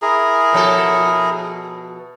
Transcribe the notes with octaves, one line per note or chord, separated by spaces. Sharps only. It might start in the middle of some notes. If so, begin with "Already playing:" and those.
E4 G#4 A#4 A#5
B2 F3 A4